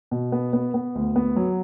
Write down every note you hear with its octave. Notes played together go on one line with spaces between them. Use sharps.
B2
B3
B3
B3
D2
B3
F#3